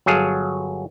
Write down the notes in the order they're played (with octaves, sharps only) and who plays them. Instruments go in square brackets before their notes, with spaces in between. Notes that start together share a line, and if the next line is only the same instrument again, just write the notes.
[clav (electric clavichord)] G1 F#3 G#4 F5 A5